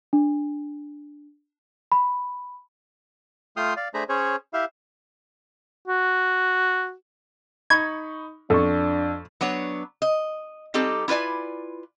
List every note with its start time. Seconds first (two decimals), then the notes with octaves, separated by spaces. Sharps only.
0.13 D4
1.92 B5
3.57 A3 F4 G5 C6 D#6 F6
3.77 D5 F5
3.94 A3 D4 G#4 C5 A#5 B5
4.09 C#4 G#4 C5 C#5
4.53 E4 G4 E5 F5
5.88 F#4
7.70 D#4 B5 C#6 G#6
8.50 F2 D4 A4 C#6
9.41 F#3 B3 D4 C#5
10.02 D#5
10.74 G3 C4 D#4 G4 A4
11.08 E4 F4 B4 D5 G#5